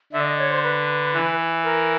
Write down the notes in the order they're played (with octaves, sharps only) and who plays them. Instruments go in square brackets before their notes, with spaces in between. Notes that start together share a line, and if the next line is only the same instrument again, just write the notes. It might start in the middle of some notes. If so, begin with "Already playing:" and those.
[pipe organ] D3 [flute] E5
[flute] D5
D#5
C#5
C5
B4
[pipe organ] E3
[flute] A#4